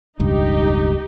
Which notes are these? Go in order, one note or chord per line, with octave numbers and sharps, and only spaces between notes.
E1 C#2 G2 D#4 G4